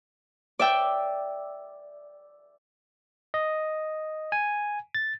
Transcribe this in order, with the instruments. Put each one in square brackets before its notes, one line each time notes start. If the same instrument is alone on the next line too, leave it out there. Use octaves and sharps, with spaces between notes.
[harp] D5 E5 G5
[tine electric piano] D#5
G#5
A6